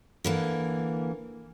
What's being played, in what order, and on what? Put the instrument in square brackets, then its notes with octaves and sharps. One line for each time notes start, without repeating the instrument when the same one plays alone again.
[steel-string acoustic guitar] D3 E3 A#3